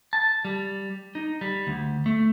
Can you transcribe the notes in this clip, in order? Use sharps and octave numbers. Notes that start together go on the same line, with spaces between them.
A5
G3
D#4
G3
D2
A3